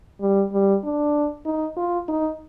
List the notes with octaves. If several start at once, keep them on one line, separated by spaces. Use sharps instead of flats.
G3
G3
D4
D#4
F4
D#4